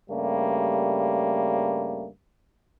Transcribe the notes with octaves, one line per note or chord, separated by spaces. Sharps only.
G2 C#3 G3 A3 A#3